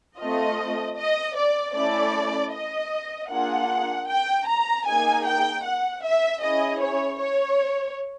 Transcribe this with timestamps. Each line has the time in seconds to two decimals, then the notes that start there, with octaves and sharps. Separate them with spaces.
0.19 A3 C4 F4 D#5
0.97 D#5
1.36 D5
1.75 A3 C#4 E4 A4 D5
2.53 D#5
3.31 A#3 D4 F4 G#4 F#5
4.08 G5
4.47 A#5
4.86 A#3 D#4 G#4 G#5
5.26 G5
5.64 F#5
6.04 E5
6.42 C#4 E4 G#4 D#5
6.80 C#5
7.21 C#5